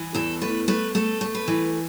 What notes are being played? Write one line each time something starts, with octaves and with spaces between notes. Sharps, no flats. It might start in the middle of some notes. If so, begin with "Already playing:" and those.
Already playing: E3
E2 A4
A3 B4
A3 B4
A3 A4
A3
B4
E3